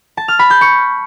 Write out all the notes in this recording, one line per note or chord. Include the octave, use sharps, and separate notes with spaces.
A5
F6
B5
G6
C#6